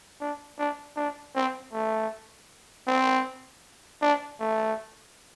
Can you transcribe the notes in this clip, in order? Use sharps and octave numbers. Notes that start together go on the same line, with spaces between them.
D4
D4
D4
C4
A3
C4
D4
A3